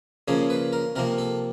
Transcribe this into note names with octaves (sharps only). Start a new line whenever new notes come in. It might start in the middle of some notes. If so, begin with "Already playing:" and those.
C#3 F3 A#3 G#4
B4
A#4
C3 F3 A#3 A#4
A4